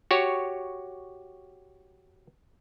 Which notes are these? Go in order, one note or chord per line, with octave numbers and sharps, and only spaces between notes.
F#4 G4 C#5